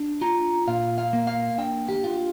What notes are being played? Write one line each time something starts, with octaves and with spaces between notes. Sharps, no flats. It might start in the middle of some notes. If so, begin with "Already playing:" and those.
Already playing: D4
F4 A#5
A#2 F5
F5
A#3
F5
D4 G5
G4
F4